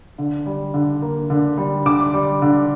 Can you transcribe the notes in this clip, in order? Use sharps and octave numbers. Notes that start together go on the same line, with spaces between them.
D3
G3
D3
A#3
D3
G3
D3 D6
G3
D3